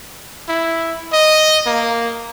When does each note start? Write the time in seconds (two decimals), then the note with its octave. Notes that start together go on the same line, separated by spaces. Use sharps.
0.49 E4
1.13 D#5
1.66 A#3